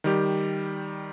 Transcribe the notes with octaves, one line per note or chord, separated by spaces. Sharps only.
D#3 G3 G4